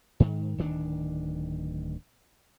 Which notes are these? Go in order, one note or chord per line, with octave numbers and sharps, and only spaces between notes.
G#2 D#3
D1 D#3 D4